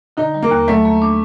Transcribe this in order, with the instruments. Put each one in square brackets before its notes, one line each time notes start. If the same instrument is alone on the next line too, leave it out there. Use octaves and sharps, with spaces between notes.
[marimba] D3 [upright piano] D#4
[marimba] G3
[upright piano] A#3
[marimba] D#2
[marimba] F#3 [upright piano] A3
[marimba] A#3
D4